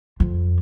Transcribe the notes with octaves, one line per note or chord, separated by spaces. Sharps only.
F2